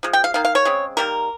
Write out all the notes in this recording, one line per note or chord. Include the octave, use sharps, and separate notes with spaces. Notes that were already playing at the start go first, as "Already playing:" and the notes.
F3 G#3
G5
F5
D#3 A#3 F5
F5
C#5
C#3 G#3 C4
D#3 G3 A#3 A#4